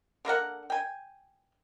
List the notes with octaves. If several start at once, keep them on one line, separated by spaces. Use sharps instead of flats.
D3 A#3 A#4 F#5
G5 G#5